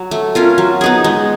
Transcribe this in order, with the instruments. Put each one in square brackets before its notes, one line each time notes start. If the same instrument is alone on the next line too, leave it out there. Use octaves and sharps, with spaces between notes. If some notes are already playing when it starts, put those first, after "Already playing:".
Already playing: [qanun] F#3
A3
C#4 F4 A#4
F#3
B3 D#4 G#4
G#3